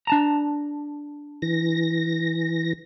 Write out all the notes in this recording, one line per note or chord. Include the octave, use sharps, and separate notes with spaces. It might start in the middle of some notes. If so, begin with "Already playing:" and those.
D4 A5 A#5
E3 A#6